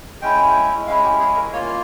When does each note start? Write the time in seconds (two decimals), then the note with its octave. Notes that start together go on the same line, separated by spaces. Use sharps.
0.22 G#3 C#4 E4 G5
0.87 G#3 C#4 E4 F5
1.04 G4
1.20 G#4
1.36 A#4
1.53 A#3 F4 C#5